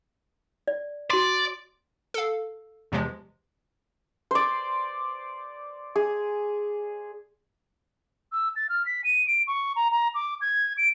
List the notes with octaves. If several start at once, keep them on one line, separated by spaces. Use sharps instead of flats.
D5
F#4 D5 C6
A4 F5
E2 C3 E3 F3 G#3
C5 D5
G#4
E6
A6
F6
B6
D#7
D7
C#6
A#5
A#5
D6
G#6
D7